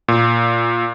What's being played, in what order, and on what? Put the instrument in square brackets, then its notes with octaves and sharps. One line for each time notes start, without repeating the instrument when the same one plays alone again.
[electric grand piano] A#2